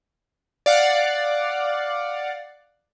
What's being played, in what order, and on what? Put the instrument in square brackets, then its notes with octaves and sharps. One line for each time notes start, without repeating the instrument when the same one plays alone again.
[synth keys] D5 F5 F#5